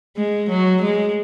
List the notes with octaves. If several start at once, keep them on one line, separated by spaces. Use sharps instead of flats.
G#3
F#3
G#3